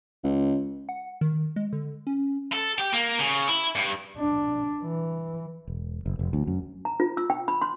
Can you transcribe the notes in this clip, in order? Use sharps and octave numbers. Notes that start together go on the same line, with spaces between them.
C#2
F#5
D#3
G#3
D3
C#4
A4
G4
A#3
C#3
E4
G2
D4
E3
E1
F#1
F1
D2
F#2
A#5
F4
E6
G5
B5
C6